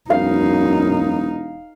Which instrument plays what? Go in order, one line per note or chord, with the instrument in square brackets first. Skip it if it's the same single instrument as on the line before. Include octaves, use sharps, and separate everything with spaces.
[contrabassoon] E1 [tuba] F#2 [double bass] D#4 [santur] F5